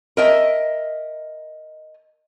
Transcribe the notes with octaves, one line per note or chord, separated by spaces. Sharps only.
A#4 D#5 E5